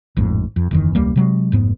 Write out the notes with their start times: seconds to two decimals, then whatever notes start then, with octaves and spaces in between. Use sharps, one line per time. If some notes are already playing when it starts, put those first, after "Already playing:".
0.17 A1 F2 G#2
0.56 F2
0.71 F#1 E2 D#3
0.95 E1 C#2 G3 A#3
1.16 C3 F#3 G#3
1.52 F1 G#2 B3